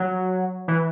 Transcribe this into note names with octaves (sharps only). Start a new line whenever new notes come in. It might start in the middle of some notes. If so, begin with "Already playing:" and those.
Already playing: F#3
E3